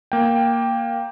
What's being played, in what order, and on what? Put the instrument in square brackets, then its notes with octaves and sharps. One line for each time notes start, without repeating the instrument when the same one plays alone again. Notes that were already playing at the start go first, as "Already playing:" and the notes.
[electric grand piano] A#3 G5